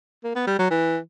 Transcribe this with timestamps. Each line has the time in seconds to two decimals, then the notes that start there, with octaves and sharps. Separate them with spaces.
0.24 A#3
0.35 B3
0.47 G3
0.59 F#3
0.71 E3